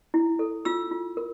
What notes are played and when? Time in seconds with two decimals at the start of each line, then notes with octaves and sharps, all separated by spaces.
0.14 E4
0.39 A4
0.65 F4 E6
0.91 F4
1.17 A#4